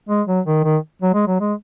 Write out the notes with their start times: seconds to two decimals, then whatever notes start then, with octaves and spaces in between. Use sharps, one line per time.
0.09 G#3
0.27 F#3
0.46 D#3
0.64 D#3
1.02 F#3
1.14 G#3
1.27 F#3
1.40 G#3